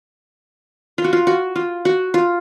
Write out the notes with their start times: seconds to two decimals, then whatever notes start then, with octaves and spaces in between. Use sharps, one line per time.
0.98 F4
1.04 F#4
1.13 F4
1.27 F#4
1.56 F4
1.85 F#4
2.14 F4